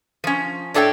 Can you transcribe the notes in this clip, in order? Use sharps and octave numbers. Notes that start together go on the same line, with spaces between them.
F3 C#4
A2 D4 A4 C#5 G5